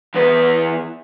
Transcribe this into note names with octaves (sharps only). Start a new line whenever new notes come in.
E2 B4